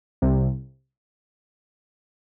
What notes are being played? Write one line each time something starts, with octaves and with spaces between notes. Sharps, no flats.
C2 C3